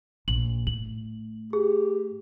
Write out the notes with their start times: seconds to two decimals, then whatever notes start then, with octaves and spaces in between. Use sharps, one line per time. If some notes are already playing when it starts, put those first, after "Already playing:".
0.28 A#1 F#7
0.67 A2 F#7
1.53 G4 G#4